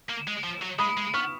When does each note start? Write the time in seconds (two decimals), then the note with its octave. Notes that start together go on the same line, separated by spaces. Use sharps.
0.09 A#3
0.27 G#3
0.44 F3
0.62 F#3
0.79 G#3 B5 D#6
0.97 G#3
1.14 B3 C#6 F6